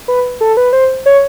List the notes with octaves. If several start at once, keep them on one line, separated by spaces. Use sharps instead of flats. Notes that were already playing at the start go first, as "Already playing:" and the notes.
B4
A4
B4
C5
C#5